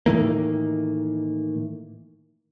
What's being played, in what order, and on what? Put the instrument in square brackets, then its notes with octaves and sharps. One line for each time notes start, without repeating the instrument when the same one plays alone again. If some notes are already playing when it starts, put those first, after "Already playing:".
[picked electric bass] A2 D#3 E3 A#3